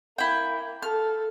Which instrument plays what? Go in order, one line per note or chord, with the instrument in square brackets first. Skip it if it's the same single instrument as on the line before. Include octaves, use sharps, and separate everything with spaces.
[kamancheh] A#3 [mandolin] E4 G5
[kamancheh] A4 [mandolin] F6